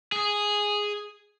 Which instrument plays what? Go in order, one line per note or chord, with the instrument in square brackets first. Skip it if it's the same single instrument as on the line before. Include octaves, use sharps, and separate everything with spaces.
[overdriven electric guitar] G#4